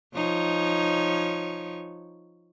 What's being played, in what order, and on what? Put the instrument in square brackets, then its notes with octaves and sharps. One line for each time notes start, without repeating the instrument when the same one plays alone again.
[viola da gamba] F3 D#4 C#5